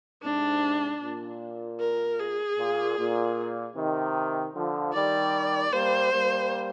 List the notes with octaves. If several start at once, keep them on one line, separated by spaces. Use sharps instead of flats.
G#2 C3 D4
A#2
A#4
G#4
A#2
A#2
C3 D#3
D3 F3
D#3 G3 D5
G3 A#3 C5
G3 A#3